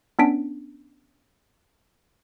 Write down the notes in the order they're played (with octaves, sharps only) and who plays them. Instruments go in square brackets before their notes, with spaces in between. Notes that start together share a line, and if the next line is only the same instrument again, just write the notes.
[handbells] B3 C#4 D4 B6 D7